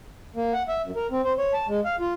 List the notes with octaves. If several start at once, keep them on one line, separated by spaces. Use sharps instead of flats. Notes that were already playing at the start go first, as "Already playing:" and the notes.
A#3
F#5
E5
F#2
A#4
C4
C5
C#5
A5
G#3
F5
F4